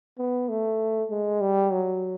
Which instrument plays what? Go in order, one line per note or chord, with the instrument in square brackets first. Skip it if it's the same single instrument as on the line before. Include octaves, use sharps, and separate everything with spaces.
[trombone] B3
A3
G#3
G3
F#3